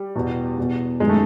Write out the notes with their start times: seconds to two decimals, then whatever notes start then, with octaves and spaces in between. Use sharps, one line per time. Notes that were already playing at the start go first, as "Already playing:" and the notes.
Already playing: G3
0.15 E2 B2
0.58 E2 B2
1.00 F#2 D#3 G#3
1.09 A3